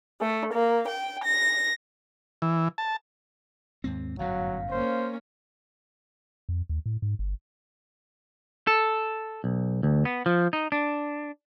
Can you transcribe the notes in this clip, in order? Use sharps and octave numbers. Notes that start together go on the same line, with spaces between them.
A3
A#3
G5
A#6
E3
A5
D#2 G#2 C4
G1 F#2 A2 F#3 F5
A#3 C#4 C5
F2
D#2
A2
G#2
G1
A4
B1
D2
B3
F3
D#4
D4